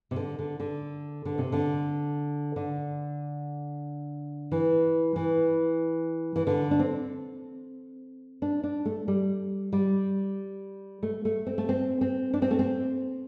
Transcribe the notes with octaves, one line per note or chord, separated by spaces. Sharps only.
C3
D3
D3
D3
D3
C3
D3
D3
E3
E3
E3
D3
D4
C4
D4
D4
A3
G3
G3
A3
A3
C4
A3
C4
C4
D4
C4
A3
C4